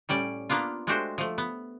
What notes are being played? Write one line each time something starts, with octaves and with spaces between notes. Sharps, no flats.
A2 G3 C#4 D5
A#3 B3 D4 F4
G#3 A3 D4 F#4 G4 C5
F3 A3
B3